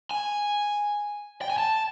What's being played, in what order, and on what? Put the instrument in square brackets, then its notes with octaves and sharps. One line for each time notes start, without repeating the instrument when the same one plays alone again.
[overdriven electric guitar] G#5
G5
G#5
A5